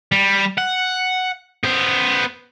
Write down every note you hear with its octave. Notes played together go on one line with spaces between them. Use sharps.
G3
F#5
B3 C5